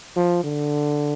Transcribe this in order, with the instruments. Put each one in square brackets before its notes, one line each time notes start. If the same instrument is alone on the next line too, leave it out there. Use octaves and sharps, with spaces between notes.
[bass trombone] F3
D3